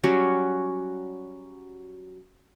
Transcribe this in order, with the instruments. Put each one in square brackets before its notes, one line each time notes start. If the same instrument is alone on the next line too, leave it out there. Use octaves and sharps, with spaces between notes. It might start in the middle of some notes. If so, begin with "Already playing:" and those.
[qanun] F#3 G3 C#4 F#4